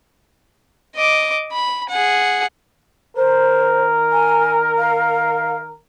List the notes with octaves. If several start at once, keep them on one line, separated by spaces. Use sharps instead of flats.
D#5 D6
B5
G#4 F#5
D#3 A#4 C5
G#5
F5